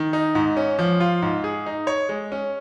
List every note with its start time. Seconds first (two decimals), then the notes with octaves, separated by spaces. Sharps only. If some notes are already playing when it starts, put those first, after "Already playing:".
Already playing: D#3
0.13 D#4
0.35 G#2
0.57 C#4
0.79 F3
1.00 F4
1.22 G#2
1.44 G#4
1.66 D#4
1.87 C#5
2.09 G#3
2.32 C#4